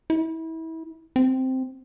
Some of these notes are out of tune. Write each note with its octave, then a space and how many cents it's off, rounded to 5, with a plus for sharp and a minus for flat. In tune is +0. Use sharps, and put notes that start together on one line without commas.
E4 -30
C4 -5